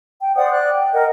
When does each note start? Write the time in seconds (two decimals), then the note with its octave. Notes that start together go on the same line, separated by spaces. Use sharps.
0.21 G5
0.36 C5 D5 F#5 D#6
0.50 D5 F#6
0.69 G5
0.93 A#4 D#5 F#5